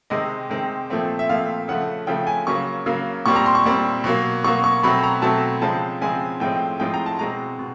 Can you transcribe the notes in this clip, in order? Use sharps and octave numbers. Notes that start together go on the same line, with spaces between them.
C3 D#3 G#3 C4 D#5
C3 D#3 G#3 C4
A#2 F3 A3 C4
E5
A#2 F3 A3 C4 F5
C#3 F3 A3 F#5
C#3 F3 A3 G5
G#5
C#3 F#3 A#3 C#6
C#3 F#3 A#3
A#2 G3 C4 C#6
A#5
C6
C#6
A#2 G3 C4
B2 F#3 A#3
B2 F#3 A#3 C#6
C#6
B2 F#3 A3 C4 B5
A#5
B2 F#3 A3 C4 A5
C#3 F3 G#3 C4 A5
C#3 F3 G#3 C4 G#5
A2 F3 G#3 C4 G5
A2 F3 G#3 C4 G5
A#5
A5
B2 G#3 C4 A#5
B2